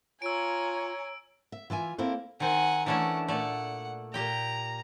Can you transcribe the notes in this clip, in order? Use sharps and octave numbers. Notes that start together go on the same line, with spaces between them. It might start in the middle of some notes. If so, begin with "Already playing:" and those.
F4 C#5 G#5 A#5 E6 D7
E5
E3 F4 E5 G#5
A#3 C4 E4 A4 C5
D#3 C4 F#5 G#5
E3 A3 C#4 D4 F#5
A#2 A3 D5 F#5
A#2 G4 G5 A#5